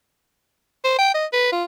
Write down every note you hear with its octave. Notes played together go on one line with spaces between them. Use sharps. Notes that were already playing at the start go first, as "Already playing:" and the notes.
C5
G5
D#5
B4
F4